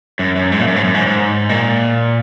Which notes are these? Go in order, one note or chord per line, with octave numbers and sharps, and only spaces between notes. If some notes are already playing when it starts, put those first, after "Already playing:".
F#2
F#2
G#2
A#2
F#2
G#2
F#2
G#2
G#2
A#2